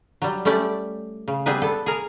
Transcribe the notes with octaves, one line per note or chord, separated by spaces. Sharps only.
F#3 G3
G3 A3 C#4 D5 E5
C#3
G3 B3 C4 G#4 B4
B3 A4
G#4 A#4